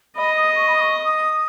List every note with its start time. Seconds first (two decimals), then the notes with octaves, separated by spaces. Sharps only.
0.16 D#5 B5
0.36 D#6
0.56 C#6
0.68 B5
0.76 D#6
0.81 C#6
1.05 D#6